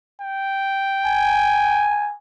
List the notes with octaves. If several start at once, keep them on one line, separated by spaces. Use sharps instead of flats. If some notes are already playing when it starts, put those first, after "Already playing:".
G5
G#5